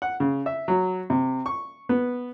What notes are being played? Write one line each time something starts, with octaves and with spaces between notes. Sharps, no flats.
F#5
C#3
E5
F#3
C3
C#6
B3